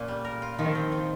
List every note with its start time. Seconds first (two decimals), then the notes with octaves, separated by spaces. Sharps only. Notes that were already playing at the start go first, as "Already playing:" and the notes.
Already playing: A#2 A#3 C#4
0.08 G3
0.25 A#4
0.42 F4
0.59 D#3 F3
0.75 C4
0.92 D#3